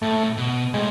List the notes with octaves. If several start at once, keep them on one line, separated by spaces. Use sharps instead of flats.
A2 A3
B2
A2 G#3